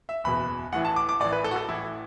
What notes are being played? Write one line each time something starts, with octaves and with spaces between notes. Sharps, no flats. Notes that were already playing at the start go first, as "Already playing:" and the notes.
E5
F#1 E2 B2 B5
A1 A2 E3 F#5
A5
D6
D6
A1 A2 E3 D5
B4
A4
F#4
A4
A1 A2 E3 E4